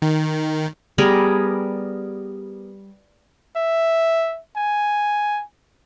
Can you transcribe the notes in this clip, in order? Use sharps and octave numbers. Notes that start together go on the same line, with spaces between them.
D#3
G3 B3 G#4 A#4
E5
G#5